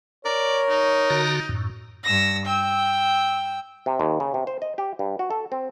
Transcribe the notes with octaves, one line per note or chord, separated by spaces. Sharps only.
A#4 C#5 D5
D#4
D3 F#4 A#5
F#2 A2
G2 E6 A#6
G5 E6
C3
D#2
C#3
C3
C5
D#5
G4
G2
F#4
A4
C4